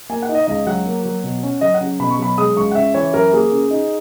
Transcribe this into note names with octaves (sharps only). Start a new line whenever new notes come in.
A#3 G#5
F#5
D#4
D#5
C#2 D#5
F#3 F#5
A#3
F#3
B2
C#4
F#3 D#5
F#5
C#3
B2 B5
C#6
F#3 B5
G#3 D#6
C#2 C#6
F#5
C#3 E5
E3 C#5
F#2 A#4
A#3 G#4
C#3
D#4